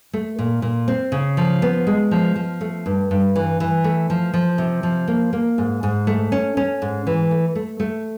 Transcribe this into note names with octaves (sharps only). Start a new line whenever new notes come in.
A3
A#2
A#2
C4
C#3
F3
B3
G#3
F3
F3
A3
G2
G2
E3
E3
A3
F3
F3
C3
F3
A#3
A#3
G#2
G#2
A3
C#4
C#4
G#2
E3
A3
A3
A3